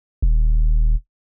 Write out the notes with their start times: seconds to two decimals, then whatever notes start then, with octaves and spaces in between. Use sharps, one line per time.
0.22 D#1